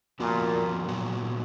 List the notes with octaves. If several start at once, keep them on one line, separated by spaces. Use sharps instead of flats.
F2 A#2 F3 B3 F#4 A#4
A#2 F#3 B3 F#4